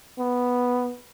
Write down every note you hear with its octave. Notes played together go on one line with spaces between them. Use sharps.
B3